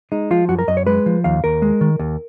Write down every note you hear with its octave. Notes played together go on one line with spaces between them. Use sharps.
G#3 D#4
F3 F4
F#2 F#4
A#4
F#2 D#5
C#5
G#3 B4
F3
D#2 F5
D#2 A#4
G#3
D#3
D#2